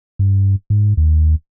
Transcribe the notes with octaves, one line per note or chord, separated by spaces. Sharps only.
G2
G#2
D#2